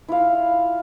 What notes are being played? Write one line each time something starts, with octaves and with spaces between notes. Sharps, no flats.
E4 F4 F5